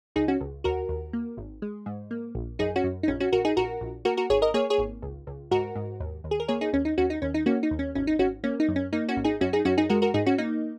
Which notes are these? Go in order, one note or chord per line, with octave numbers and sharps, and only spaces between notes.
C#2 D#4 G#4
C#4 F#4
C#2
D#2 F#4 A#4
D#2
A#3
G#1
G#3
G#2
A#3
A#1
F#2 D#4 G#4
C#4 F#4
F#2
D#4
A#1 C#4
C#4 F#4
A#1 F#4 A#4
D#4 G#4
A#1 F#4 A#4
A#1
A#3 F#4 A#4
F#4 A#4
G#1 G#4 C#5
A#4 D#5
A#3 G#4 C#5
G#4 C#5
G#1
C#2
C#2
G#2 F#4 A#4
G#2
D#2
D#2
G#4
A#4
A#3 G#4 C#5
D#4 G#4
D#2 C#4
D#4
D#2 C#4 F#4
D#4
D#2 C#4
D#4
A#3 C#4 F#4
D#4
D#2
C#4
G#1 C#4
D#4
G#1 C#4 F#4
A#3 C#4
D#4
F#2
C#4
A#3 D#4
C#4 F#4
G#1
D#4 G#4
F#2 C#4 F#4
D#4 G#4
F#2 C#4 F#4
D#4 G#4
G#3 F#4 A#4
F#4 A#4
G#2 D#4 G#4
C#4 F#4
A#3 D#4